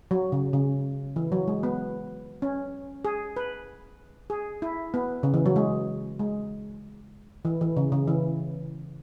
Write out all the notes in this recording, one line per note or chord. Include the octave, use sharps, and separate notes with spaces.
F#3
C#3
C#3
E3
F#3
G#3
B3
C#4
G#4
B4
G#4
E4
B3
C#3
E3
F#3
G#3
G#3
E3
E3
C#3
C#3
E3